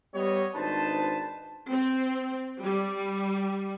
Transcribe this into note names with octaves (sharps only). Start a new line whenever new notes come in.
G3 B3 C#5 D#5
G#1 D4 D#4 B4 C5 A5
C4
G3